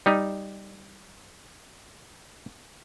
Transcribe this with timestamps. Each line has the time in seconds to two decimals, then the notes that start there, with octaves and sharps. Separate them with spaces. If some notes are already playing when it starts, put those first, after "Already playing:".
0.06 G3 D#4